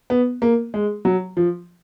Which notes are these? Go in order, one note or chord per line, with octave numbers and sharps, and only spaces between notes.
B3
A#3
G#3
F#3
F3